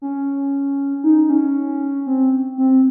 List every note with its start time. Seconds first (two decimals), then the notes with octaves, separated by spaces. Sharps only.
0.02 C#4
1.04 D#4
1.30 C#4
2.06 C4
2.58 C4